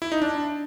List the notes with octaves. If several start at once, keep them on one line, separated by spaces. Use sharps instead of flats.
E4
D#4
D4